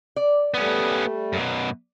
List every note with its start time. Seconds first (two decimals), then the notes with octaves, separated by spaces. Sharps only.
0.16 D5
0.54 G3 A3 B3 C#4
1.33 F#2 B2